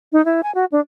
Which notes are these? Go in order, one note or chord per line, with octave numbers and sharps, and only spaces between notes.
D#4
E4
G#5
F#4
D4